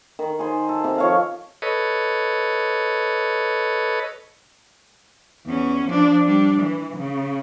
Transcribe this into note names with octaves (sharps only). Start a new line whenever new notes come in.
D#3
G#4 C5
A4
C3
F3 C#5 F5
A4 B4 C#5 D#5
E2 C#4
F3 D4
G3 D4
E3
C#3